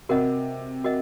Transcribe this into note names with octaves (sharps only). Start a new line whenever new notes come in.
C3 F#4 A#4 D#5 F#5
F#4 A#4 D#5 F#5